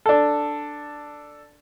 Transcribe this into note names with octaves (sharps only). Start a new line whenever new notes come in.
D4 A4